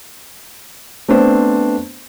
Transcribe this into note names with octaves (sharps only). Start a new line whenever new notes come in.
A3 B3 C4 D4 C5